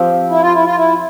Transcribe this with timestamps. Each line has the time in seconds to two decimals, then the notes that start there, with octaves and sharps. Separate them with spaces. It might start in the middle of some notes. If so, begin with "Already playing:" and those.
Already playing: F3 C4 G4
0.30 E4
0.41 F4
0.53 E4
0.64 F4
0.76 E4